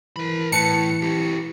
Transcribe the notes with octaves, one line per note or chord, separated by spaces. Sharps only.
E3 A#4 B5
A2 E3 B4 A5 C#7
E4 G4